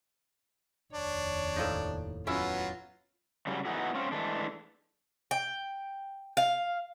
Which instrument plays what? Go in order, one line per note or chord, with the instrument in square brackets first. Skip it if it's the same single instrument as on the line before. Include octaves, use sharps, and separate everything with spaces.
[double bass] F1 D#2 [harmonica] D4 [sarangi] C#5
[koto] A2 F3 D#4
[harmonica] F#3 B3 [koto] C#4 E4 [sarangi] F4
[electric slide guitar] C#3 F#3 G3
B3 D#4 E4 F#4 G#4
C4 C#4 F4
E3 G#3 A3 D4
[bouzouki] G5
F5